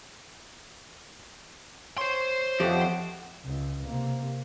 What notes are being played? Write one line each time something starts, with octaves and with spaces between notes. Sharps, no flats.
C5 C#5 C6
F2 A3 B3 G4 D#5
C#2
C3 A#3